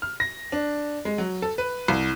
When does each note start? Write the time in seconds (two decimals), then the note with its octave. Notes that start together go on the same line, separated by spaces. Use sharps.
0.02 F6
0.20 A#6
0.52 D4
1.05 G#3
1.18 F#3
1.42 A4
1.58 B4
1.88 C2